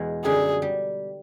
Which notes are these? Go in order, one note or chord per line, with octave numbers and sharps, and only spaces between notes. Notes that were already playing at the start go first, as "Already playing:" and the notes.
Already playing: E2 B2 G#3
F#2 D3 G3 G#4
G3